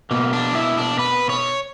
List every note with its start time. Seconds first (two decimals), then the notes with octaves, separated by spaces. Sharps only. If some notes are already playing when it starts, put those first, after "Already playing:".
0.11 B2 A#3
0.33 D4
0.55 E4
0.78 D4
0.99 B4
1.29 C#5